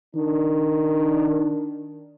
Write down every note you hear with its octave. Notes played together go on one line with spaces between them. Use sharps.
D#3 D4